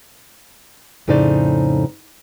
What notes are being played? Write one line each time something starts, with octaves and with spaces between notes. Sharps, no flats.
F2 A2 C#3 D#4 C5 D5